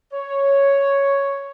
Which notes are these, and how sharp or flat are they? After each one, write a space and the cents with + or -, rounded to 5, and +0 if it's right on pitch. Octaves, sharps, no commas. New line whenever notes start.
C#5 +0